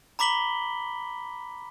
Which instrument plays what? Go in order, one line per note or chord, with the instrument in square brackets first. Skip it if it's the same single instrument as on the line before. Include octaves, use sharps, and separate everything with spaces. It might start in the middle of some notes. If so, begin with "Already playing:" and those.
[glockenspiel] A#5 B5 D6 B6 F#7 G7